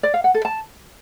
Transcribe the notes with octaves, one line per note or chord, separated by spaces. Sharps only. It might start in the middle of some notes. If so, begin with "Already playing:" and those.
D5
F5
F#5
A4
A5